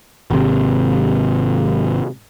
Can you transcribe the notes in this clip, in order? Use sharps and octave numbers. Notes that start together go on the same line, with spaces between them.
G#1 C3